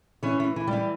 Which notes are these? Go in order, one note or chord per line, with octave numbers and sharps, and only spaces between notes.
E3 C#4 C#5
E3
E3
G3 G4
E3